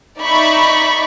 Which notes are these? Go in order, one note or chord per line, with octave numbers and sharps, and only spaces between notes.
D#4 D5 E5 B5 C#6